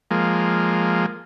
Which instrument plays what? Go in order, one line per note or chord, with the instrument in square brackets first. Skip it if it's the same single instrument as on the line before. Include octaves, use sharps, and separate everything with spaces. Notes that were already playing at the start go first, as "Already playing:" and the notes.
[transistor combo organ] F3 G#3 A#3